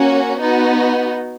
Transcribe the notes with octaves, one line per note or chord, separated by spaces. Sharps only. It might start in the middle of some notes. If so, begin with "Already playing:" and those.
Already playing: A#3 C#4 F#4
B3 D#4 F#4